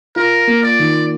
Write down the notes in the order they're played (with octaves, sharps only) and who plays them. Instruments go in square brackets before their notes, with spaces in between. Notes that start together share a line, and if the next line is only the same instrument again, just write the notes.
[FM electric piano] F4 [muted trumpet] A#4
[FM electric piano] A#3
[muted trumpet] D5
[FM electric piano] D#3